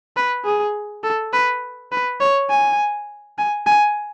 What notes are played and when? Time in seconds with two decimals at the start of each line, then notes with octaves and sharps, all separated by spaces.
0.16 B4
0.45 G#4
1.03 A4
1.33 B4
1.92 B4
2.20 C#5
2.50 G#5
3.38 G#5
3.66 G#5